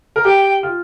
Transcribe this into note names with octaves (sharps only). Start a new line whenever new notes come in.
A#4
G4 G5
F4